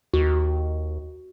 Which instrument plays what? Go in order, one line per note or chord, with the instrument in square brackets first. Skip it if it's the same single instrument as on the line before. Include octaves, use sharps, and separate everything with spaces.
[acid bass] D#2 [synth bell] F#4